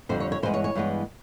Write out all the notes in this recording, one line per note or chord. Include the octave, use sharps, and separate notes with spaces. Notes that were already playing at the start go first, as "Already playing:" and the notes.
F2 D3 G3 C5
C#5
C#5
G2 E3 G#3 B3 C5
C#5
C#5
G2 E3 G#3 B3